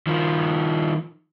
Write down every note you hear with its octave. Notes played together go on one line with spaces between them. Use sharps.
D#3 F3